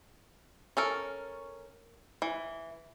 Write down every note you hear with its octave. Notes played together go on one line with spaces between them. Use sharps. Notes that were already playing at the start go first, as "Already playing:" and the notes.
C#4 A4 A#4
E3